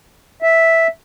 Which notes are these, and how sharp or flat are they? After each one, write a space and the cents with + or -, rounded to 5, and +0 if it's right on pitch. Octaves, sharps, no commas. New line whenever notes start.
E5 -5